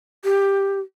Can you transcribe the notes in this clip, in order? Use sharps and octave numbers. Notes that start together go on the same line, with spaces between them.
G4